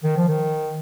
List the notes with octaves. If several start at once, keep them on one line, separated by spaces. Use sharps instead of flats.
D#3
F3
D#3